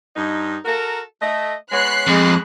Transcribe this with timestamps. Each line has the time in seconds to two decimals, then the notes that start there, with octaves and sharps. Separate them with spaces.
0.14 G2 D#4
0.65 F#4 A4 A#4
1.20 A3 D#5
1.71 G#3 B3 C#5 B5 F#6 C7
2.07 F2 G#3